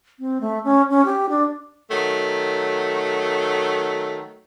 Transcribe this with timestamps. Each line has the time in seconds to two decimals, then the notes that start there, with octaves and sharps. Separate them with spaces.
0.20 C4
0.41 A3
0.65 C#4
0.90 C#4
1.05 G4
1.29 D4
1.89 D#3 F#3 A3